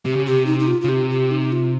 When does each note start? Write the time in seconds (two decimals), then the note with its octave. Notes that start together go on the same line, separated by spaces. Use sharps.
0.05 C3 G4
0.16 C#3
0.26 C3 G4
0.46 D#4
0.60 D#4
0.68 F4
0.81 C#3 F4
0.89 C3 G4
1.10 G4
1.31 D#4
1.52 F4